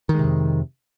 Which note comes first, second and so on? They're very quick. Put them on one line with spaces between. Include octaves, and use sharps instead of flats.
D#3 G#3 C3 F2